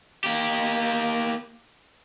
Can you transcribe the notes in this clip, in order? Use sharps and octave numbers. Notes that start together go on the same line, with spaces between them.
A#3 G4